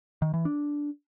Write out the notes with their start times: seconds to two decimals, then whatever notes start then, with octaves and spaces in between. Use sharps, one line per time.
0.22 D#3
0.34 E3
0.45 D4